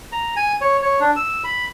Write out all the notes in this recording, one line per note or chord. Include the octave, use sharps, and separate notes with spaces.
A#5
G#5
C#5
C#5
D4
E6
B5